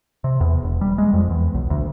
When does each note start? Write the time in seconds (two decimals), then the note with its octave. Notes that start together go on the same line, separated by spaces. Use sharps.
0.24 C3
0.41 E2
0.63 E1
0.81 G3
0.98 G#3
1.13 F2
1.30 E2
1.55 B1
1.70 D2